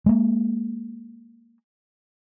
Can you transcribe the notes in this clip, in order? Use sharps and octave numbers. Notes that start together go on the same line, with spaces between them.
G#3 A#3